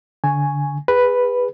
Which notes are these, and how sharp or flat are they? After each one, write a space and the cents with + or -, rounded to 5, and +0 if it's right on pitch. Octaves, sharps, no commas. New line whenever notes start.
D3 -20 G#5 +0 C#6 +0
G#4 -35 B4 +0